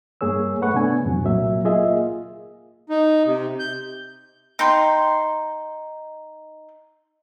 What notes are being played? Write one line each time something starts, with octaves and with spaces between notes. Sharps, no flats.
G2 A#3 G#4 C#5 E6
A3 B4 F#5 C#6
C3 B3 D4 G#5
F2 A2 C3 F#3
C2 A#2 F#3 A#3 E5
A#3 F4 G#4 D#5 E5
D#4
C3
G6
D#4 G5 C6